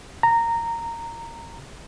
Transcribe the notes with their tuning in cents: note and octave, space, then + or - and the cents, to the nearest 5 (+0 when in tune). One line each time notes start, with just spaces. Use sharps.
A#5 -15